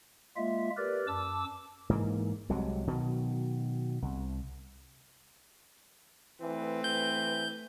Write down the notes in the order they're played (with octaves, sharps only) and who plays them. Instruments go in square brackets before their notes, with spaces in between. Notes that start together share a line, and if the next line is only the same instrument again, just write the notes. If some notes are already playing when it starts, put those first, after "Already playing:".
[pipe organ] G#3 A#3 F4 E5
G4 A#4 B4 D5
F#2 A5 D6 E6
[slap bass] G#2 E3 A#3
C2 C3 F#3 G#3
B2 D#3 F#3
C2
[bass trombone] E3 [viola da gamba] A3 B4 [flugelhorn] C4
[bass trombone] E3 [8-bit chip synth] G6